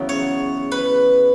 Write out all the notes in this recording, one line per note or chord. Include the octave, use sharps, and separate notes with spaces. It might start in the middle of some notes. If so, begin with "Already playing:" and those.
Already playing: E2 C#3 F#3
C#5
B4